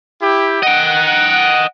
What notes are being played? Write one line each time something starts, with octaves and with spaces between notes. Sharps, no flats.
E4 G4
D#5 F#5 G5